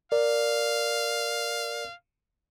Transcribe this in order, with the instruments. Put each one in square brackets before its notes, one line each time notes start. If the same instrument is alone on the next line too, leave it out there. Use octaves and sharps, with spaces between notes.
[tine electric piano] A#4 D5 [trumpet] F5